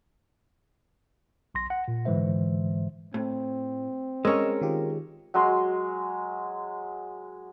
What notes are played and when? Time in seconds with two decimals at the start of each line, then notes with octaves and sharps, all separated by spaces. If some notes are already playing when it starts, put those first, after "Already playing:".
1.55 B1 C6 A#6
1.70 F#5
1.88 A#2
2.05 G#2 D3 E3 G#3 C5 E5
3.14 A2 C4
4.25 G#3 C#4 A#4 C#5 D#5 E6
4.61 D#3 F4 G4
5.34 F#3 G#3 C6